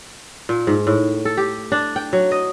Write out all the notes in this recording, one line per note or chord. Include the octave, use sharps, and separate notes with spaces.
A#2
G#2
A2
A4
G4
D4
G5
F#3
D#5